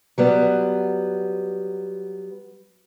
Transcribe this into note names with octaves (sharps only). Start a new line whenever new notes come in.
F#3 G3 B3